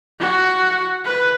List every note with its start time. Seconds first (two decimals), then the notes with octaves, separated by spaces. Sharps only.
0.20 F#4
1.05 B4